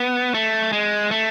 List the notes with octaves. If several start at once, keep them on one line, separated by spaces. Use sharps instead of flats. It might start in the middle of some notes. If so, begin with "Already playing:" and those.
Already playing: B3
A3
G#3
A3